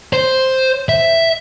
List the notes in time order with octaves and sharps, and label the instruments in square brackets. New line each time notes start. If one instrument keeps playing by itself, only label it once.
[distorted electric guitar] C5
E5